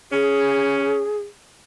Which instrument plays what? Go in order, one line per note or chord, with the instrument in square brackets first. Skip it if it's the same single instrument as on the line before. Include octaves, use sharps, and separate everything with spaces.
[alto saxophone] C#4 [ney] G#4